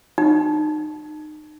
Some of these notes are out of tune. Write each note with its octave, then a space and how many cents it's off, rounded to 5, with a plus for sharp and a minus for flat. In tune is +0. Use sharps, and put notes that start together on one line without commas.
D#4 -30